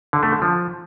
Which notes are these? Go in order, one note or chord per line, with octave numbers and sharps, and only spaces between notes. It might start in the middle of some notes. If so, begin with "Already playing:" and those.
D3
A3
D3
F3